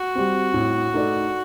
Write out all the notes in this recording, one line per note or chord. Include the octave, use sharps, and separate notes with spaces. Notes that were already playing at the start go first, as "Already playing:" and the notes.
Already playing: F#4
G3 C4
A2
A3 D#4 A4 D5